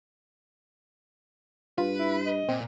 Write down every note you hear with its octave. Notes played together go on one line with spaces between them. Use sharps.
G2 F4 B4
E4
D#5
A#2 C4